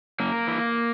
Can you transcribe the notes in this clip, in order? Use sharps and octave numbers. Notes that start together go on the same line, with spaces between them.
F#2 A#3
E3